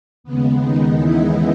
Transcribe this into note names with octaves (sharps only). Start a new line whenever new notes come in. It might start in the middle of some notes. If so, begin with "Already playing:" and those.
D#2 C#3 G#3 B3
D#3 D#4
E3 E4